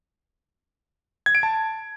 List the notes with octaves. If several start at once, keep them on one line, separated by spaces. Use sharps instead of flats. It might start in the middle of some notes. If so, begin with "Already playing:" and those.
G#6
D7
A5